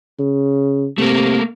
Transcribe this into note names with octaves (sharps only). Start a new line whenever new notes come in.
C#3
C3 A3 A#3